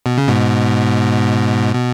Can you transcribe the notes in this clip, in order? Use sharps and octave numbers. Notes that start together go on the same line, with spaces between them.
B2
C#3
G#2 B2
B2